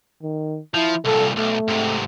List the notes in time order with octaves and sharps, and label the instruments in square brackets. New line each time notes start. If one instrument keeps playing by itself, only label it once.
[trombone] D#3
[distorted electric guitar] F3 [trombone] E4
[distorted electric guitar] C2 A#2 [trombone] A4
[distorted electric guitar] B1 [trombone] A3
[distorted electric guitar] G#2 C3